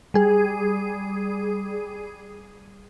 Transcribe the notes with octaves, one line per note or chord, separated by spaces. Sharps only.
G3 G#4